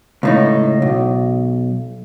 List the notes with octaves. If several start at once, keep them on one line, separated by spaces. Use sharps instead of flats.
C#2 A2 D#4
B1